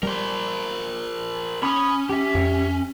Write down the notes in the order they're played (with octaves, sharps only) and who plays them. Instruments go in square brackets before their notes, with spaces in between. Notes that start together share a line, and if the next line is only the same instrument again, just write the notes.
[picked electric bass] G3 [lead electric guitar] A#4 C5
[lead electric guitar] C#4 [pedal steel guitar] B5 D#6
[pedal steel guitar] G4 E5
[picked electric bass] F2